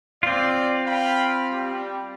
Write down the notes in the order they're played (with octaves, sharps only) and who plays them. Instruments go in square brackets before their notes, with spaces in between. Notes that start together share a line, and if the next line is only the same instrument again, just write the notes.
[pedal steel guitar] C4 F4 [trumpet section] D5
[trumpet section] F5 G5 B5
G3